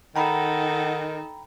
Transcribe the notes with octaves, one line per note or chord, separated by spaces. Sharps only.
D#3 D#4 A4 F#5 G5 A#5 B5